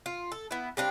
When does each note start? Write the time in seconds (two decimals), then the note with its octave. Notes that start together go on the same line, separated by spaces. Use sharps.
0.06 F4
0.32 A4
0.51 B3 E4
0.77 G3 C4 D4 F5